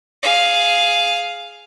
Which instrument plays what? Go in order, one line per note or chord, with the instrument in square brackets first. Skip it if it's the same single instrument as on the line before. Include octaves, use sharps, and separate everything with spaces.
[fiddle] G#4 F5